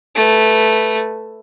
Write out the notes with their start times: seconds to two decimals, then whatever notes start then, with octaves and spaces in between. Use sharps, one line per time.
0.15 A3 B4